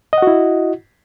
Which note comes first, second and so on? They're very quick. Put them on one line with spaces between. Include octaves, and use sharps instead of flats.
D#5 F#5 F#4 E4